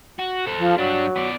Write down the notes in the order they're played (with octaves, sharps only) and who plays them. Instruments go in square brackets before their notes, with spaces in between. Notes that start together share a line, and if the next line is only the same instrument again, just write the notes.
[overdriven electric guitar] F#4
A4 C5
[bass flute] F3
[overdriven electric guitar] G2 D4 [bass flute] F#3
[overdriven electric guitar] B3 D5